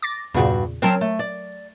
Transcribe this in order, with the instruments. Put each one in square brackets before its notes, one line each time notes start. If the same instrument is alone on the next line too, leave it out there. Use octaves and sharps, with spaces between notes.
[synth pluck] D6 A6 A#6
[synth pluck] E2 A#2 C#3 [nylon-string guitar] G2 F#4
[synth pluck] F#3 A#4 [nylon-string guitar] C4 C#5 A5
[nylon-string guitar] A3
D5